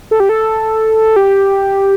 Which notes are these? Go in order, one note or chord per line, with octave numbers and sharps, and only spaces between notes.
A4
G4
A4
G4